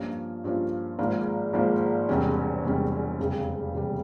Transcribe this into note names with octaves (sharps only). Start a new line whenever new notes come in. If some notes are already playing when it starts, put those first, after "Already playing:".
Already playing: G2 F3 A#3 C#4 F4
G2 F3 A#3 C#4 F4
G#1 G#2 F3 A#3
G#1 G#2 F3 A#3
E1 E2 C3 G3 C#4
E1 E2 C3 G3 C#4
F1 E2 C#3 G3
F1 E2 C#3 G3